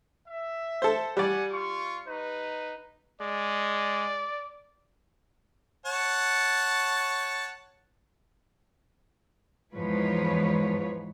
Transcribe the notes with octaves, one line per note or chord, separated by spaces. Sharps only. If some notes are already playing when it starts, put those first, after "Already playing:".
E5
A4 C5
G3 D5 F#5 G#5
F4 C#6
D#4 B4
G#3 D5
C#5 F#5 A5
E2 G#2 E3 F3 B4 C#5